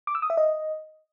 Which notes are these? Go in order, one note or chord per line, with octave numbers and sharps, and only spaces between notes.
D6
E6
D#6
E5
D#5